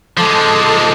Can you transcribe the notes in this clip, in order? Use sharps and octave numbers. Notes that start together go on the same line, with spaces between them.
F3 G#3 A4 A5 D6